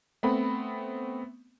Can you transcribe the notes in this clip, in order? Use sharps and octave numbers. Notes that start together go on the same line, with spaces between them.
A3 B3 C4 B5